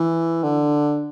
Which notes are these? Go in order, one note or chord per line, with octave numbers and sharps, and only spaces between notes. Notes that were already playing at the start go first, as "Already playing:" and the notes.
Already playing: E3
D3